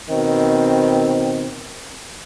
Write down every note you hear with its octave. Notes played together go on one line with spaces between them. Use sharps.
B2 D#3 C4